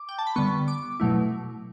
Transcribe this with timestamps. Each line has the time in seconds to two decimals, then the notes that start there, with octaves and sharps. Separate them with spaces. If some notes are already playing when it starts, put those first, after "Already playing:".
Already playing: D6
0.09 G5
0.19 A5
0.27 B5
0.36 D3 G3 B3 C#6
0.68 D6
1.00 B2 F#3 A3 E4